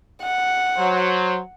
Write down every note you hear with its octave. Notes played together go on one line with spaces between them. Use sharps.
F#5
F#3 C5